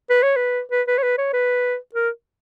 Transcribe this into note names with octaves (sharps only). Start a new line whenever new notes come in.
B4
C#5
B4
B4
B4
C#5
B4
C#5
B4
A#4